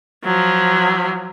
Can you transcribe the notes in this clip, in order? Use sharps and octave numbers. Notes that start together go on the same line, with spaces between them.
F3 F#3